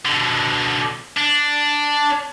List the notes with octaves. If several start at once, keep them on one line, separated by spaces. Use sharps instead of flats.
B2 D3
D4